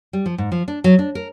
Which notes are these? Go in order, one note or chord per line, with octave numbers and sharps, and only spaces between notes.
G3
F3
G#2
F3
D4
F#3
D4
A#4